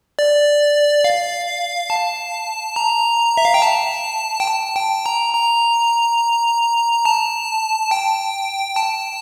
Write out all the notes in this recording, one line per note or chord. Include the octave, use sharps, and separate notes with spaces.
D5
F5
A5
A#5
E5
F5
G5
A5
G5
A5
G5
A#5
A#5
A5
G5
A5